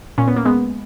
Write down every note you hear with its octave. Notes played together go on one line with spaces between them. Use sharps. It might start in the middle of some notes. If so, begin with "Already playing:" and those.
A#2 C#4
B3
A#3
G#3 B3